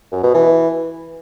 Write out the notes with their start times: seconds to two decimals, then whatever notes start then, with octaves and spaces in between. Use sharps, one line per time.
0.12 F#2
0.23 B2
0.34 E3